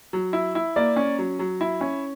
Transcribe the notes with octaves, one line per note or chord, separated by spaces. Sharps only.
F#3
E4
E4
A#3 D5
C#4
F#3
F#3
E4
C#4